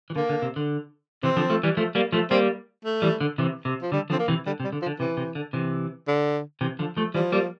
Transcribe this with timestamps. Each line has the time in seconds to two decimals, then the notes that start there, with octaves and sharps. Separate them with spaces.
0.10 E3
0.16 D3 A#3
0.29 D3
0.42 C3
0.56 D3
1.23 C3 E3 C4
1.37 D3 F3
1.50 F3 A3
1.63 E3 G3
1.77 F3 A3
1.95 G3 A#3
2.12 F3 A3
2.30 G3 A#3 C4
2.85 A3
3.02 E3 G3
3.21 D3
3.38 C3 E3
3.65 C3
3.82 F3
3.92 D3 G3
4.10 D3 F3 C4
4.19 A#3
4.28 C3 E3
4.46 D3 G3
4.60 C3
4.64 G3
4.73 D3
4.82 F3
4.86 D3
5.00 C3 E3
5.17 C3
5.35 D3
5.53 C3 E3
6.07 D3
6.61 C3 E3
6.79 D3 F3
6.97 F3 A3
7.15 E3 F3 G3
7.32 G3 A#3